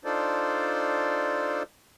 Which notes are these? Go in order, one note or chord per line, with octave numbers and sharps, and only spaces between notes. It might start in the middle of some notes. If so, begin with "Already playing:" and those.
D4 D#4 F4 A4 C5 D5